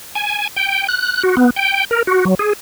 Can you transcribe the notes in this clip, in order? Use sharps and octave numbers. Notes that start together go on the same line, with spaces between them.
G#5
G5
F#6
F#4
B3
G5
A#4
F#4
F#3
G#4